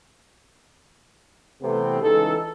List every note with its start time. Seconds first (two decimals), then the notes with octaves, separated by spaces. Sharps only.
1.62 C3 E3 A3 B3 C4
2.01 C#2 E3 D#4 A4